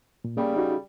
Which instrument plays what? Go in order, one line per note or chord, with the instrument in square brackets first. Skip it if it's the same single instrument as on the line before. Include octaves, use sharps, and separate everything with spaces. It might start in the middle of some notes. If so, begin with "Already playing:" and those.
[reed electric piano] A#2
[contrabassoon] C#3 [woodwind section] G3 [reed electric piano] A#3
[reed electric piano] D#4 F#4